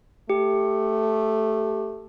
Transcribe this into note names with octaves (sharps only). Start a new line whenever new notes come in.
A3 G4